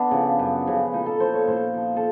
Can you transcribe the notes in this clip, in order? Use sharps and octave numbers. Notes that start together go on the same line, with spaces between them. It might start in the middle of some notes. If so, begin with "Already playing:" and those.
Already playing: B3 D4
C#3 F3
F#2
C#3 F3
A#2 D#4
A4
F3 C5
C#5
A#2 C5
F3
A4